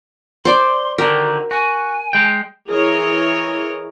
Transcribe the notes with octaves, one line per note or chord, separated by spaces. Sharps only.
C5 D5 C6
D3 D#3 F#4 G4 A#4
F#4 G#5
G#3 G5
E3 G#4 A#4 C#5 D#5